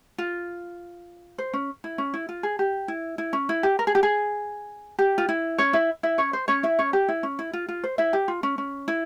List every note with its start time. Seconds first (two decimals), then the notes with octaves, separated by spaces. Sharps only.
0.18 F4
1.38 C5
1.54 C#4
1.84 E4
1.98 C#4
2.14 E4
2.29 F4
2.43 G#4
2.59 G4
2.88 E4
3.18 E4
3.33 C#4
3.49 E4
3.63 G4
3.79 A#4
3.87 G#4
3.95 G4
4.03 G#4
4.99 G4
5.18 F4
5.29 E4
5.58 C#4 C#5
5.73 E4 E5
6.03 E4 E5
6.18 C#4 C#5
6.33 C5
6.48 C#4 C#5
6.63 E4 E5
6.79 C#4 C#5
6.93 G4
7.09 E4
7.23 C#4
7.39 E4
7.53 F4
7.68 F4
7.84 C5
7.98 E4 E5
8.13 G4
8.28 F4
8.43 C#4
8.58 C#4
8.88 E4